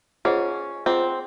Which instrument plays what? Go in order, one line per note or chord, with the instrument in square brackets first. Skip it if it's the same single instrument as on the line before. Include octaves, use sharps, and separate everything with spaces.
[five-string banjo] C#4 [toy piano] F4 G#4 C5 D#5 F#5
[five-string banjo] C4 [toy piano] F4 G#4 C5 D#5 F#5